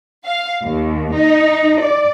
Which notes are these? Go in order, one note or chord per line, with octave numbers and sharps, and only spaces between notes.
F5
D#2
D#4
D5